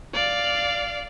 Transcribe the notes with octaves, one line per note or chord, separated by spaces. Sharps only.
D5 F5